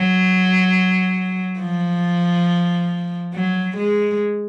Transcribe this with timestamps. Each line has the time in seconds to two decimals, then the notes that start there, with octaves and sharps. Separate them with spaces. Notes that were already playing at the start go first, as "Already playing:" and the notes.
Already playing: F#3
1.60 F3
3.34 F#3
3.77 G#3